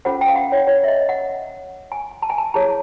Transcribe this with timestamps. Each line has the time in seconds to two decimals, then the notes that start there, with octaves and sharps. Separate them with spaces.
0.05 C#4 F4 A4 C5 F#5
0.21 G5
0.28 F5
0.36 F#5
0.52 C#5
0.67 C#5
0.84 E5
0.88 D#5
1.09 F#5
1.92 G#5
2.22 A5
2.30 G#5
2.38 A5
2.54 E4 G#4 C#5 A5